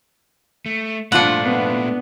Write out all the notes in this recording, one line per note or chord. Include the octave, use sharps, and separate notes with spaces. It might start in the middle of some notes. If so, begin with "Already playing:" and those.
A3
G2 A#2 F3 A3 D4 F4 F#5
B3